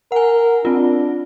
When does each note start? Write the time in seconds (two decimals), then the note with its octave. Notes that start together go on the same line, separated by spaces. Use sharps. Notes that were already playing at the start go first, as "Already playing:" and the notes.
0.12 A#4 F#5 G#5
0.65 C4 D4 F4